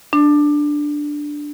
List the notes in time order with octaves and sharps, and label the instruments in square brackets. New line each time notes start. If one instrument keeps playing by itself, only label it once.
[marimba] D4